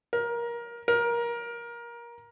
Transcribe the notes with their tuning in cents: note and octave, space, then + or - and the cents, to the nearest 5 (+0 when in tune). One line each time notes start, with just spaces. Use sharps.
A#4 +20
A#4 +20